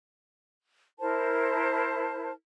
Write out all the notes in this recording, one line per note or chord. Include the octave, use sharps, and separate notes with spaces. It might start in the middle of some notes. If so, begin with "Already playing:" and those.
E4 A#4 C5 A5